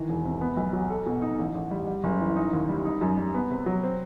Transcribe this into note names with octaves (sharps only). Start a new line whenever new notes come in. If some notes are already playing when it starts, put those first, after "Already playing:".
Already playing: D#3 E3
E1
C3
B3
B1
F#3
A4
B2
D#4
A1
A1
G3
G3
F#1
E3
D#4
D#2
G3
D#4
F#2
G3
B3
C3
F#3
C4